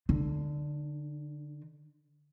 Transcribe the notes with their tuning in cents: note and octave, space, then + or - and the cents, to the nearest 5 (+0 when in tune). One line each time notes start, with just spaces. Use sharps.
D3 +0 D#4 -40